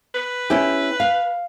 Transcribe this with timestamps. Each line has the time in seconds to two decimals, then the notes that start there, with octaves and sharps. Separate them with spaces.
0.14 B4
0.50 C#4 E4 G4
1.00 F5